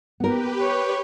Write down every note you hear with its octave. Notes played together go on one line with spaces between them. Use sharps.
B3 G4 A#4 B4
C#5